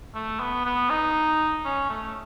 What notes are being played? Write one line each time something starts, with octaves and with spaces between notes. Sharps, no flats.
A3
B3
B3
D#4
C#4
A3